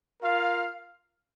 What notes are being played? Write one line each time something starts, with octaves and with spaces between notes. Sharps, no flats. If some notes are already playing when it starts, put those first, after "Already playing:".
F4 A#4 F5